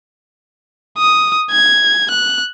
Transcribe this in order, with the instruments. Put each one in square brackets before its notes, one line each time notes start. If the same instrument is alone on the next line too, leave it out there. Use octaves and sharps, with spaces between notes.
[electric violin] D#6
G#6
F#6